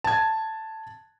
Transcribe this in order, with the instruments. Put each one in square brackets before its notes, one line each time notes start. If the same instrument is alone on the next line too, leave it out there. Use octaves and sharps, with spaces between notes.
[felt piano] A5 G#6